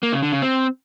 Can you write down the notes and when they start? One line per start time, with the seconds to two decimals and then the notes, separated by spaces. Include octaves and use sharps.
0.03 A#3
0.13 C#3
0.22 D3
0.32 C#3
0.42 C4